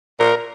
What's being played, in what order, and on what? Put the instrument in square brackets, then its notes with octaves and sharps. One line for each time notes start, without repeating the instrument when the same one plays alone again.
[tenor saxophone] A#2 [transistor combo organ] A#4